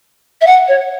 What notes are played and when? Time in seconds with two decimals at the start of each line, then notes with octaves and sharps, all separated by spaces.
0.41 E5
0.47 F#5
0.68 C#5